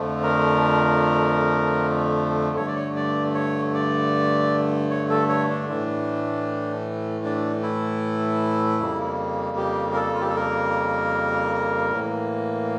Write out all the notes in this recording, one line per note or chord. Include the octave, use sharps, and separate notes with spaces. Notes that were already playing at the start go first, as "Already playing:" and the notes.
Already playing: F2 D3 F3 A3
A#4
G2 D3 A3 C#5
D5
C#5
D5
C#5
D5
C#5
A4
C#5
D4
A2 E3 A3
D4
E4
F2 C#3 G3 A#3
G4
A#4
A4
F4
G4
A4
A#4
A2 E3 A#3